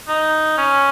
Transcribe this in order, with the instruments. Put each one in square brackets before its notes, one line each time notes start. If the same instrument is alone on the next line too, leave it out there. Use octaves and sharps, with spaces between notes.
[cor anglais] D#4
C#4